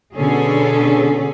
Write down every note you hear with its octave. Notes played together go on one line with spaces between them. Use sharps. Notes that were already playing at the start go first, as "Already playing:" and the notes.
B2 D3 C#4 D4 G#4 A4